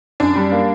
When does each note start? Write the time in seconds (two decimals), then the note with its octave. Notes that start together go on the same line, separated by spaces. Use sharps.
0.20 F#2 D4
0.36 G3
0.52 A#3